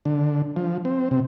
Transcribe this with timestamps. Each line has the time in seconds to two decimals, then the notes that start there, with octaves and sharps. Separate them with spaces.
0.05 D3
0.56 F3
0.85 C4
1.11 C3